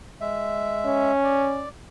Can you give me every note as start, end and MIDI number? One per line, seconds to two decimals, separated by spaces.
0.21 1.12 56
0.21 1.12 76
0.85 1.66 61
1.24 1.69 74